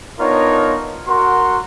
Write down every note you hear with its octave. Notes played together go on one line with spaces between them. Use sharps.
B3 D4 D#4 F4 A#4 C#5
F#4 A#4 F#5 C6